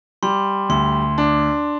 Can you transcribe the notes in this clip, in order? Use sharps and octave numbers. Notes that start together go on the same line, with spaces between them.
G3 C6
D2 C6
D4